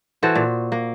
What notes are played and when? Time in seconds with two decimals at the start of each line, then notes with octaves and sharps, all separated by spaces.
0.23 E3 F#4 A4 C5
0.35 A#2
0.72 A#3